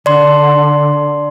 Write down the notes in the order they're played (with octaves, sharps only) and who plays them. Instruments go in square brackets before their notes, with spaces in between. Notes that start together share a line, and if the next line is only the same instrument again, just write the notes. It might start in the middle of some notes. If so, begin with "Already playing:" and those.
[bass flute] D3 [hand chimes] D5 C6